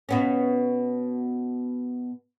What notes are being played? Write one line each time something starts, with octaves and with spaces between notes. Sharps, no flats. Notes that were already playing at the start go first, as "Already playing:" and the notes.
B2 B3 C#4